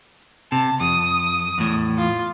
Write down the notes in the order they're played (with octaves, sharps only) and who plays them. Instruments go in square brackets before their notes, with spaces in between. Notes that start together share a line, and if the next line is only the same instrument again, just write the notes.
[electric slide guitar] C3 [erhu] A5
[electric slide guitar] F2 [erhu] D#6
[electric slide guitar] E2 A2
[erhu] F4